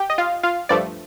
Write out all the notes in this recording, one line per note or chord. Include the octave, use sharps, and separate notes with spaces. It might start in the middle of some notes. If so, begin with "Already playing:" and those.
Already playing: G4 G5
D#5
F4 F5
F4 F5
G2 F3 A3 D5